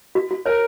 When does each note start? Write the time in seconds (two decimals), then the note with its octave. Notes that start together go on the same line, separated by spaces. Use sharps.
0.15 F#4
0.31 F#4
0.46 A#4 C#5